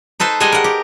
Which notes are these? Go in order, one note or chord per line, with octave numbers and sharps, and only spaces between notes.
D#4 A4 B4 C5
G3 G#3 A4 D#5 G#5
A#4 F#5
G4